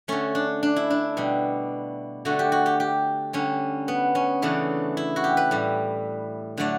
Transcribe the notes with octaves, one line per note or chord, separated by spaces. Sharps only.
D3 A3 C#4
D4
D4
E4
D4
B2 G3
D3 A3 F#4
G4
F#4
G4
G4
D3 G3 C#4
B3
C#4
C#3 E3 A3 D4
E4
F#4
G4
B4
A2 G3
D3 F#3 A3 D5